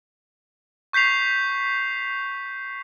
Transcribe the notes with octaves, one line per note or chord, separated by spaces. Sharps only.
C#6 G6 B6 C7 F7